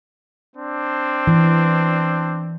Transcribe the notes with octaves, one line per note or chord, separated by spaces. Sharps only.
C4 D4
E3